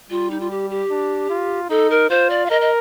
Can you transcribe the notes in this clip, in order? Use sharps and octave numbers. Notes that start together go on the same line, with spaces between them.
G3 F4
D#4
F4
G4
G4
D4
F4
D#4 A4
A#4
F4 C5
D5
F5
A#4 D#5
D#5